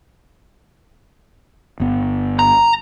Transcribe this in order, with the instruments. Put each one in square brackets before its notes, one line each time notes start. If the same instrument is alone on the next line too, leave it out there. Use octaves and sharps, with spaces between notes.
[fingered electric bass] G1 B3
[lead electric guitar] A#5